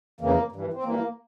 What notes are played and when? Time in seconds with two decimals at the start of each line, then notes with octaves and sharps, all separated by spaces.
0.21 F2 C#3 E3 A#3
0.52 G2 E3
0.73 C4
0.83 G2 E3 A#3